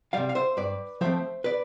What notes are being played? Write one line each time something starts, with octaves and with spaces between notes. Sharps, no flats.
C3 G3 D5 F5
F5
C5 E5
G2 B4 D5
F3 A3 C4 C5 E5
B4 D5